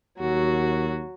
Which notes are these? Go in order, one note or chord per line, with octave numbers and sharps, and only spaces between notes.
D#2 F#3 F#4